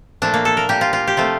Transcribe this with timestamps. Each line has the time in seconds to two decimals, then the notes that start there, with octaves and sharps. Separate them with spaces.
0.22 A#2 F3 A3 D4
0.34 A#3
0.45 A4
0.57 A#4
0.69 A#2 G3 G4
0.81 F4
0.93 F4
1.07 G4
1.17 C3 F3 A3 F4